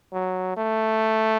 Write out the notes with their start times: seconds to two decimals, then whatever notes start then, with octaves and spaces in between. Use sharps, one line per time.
0.13 F#3
0.57 A3